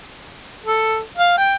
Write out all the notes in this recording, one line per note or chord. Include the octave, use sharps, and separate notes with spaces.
A4
F5
G5